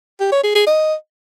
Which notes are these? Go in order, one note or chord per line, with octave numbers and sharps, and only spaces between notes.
G4
C#5
G#4
G#4
D#5